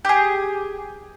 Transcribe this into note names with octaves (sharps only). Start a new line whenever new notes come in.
G4 G#4